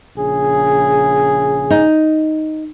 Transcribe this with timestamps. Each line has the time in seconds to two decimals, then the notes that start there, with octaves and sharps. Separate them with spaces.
0.17 A#1 C#3 G#4
1.70 D#4